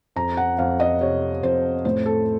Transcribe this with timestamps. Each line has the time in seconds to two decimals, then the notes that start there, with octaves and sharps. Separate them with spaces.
0.16 F2 A#5
0.37 F#5
0.58 F2 F5
0.80 D#5
1.01 C3 C#5
1.43 F2 C5
1.85 A2 C5
2.06 A4